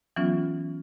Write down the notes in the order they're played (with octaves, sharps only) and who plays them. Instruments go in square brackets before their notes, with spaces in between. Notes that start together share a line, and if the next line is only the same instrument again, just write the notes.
[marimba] E3 F#3 B3 C#4 F4